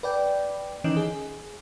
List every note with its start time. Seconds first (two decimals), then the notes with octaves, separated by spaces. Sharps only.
0.03 B4 D5 G5
0.84 D#3 E3 C#4 D#4
0.97 G#4